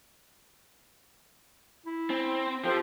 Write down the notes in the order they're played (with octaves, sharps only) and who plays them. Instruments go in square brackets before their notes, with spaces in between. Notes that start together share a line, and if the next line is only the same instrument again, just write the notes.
[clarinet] E4
[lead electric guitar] C4
[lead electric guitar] F3 [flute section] G4 A4 C5 [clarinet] G5